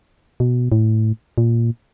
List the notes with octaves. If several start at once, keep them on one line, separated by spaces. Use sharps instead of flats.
B2
A2
A#2